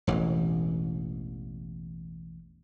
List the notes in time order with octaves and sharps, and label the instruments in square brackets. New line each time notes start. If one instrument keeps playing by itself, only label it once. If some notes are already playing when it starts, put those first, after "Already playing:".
[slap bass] E1 A1 E3